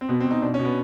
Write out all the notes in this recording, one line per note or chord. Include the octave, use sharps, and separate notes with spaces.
C4
B2 B3
C4
B2
D#4
B2 D4
C#4
B2
B3